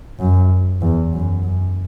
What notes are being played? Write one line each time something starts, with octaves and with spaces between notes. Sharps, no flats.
F#2
E2
F#2
F#2